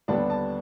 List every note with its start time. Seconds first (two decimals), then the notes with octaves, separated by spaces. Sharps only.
0.08 D#2 D3 G3 B3 D4 A5
0.30 A5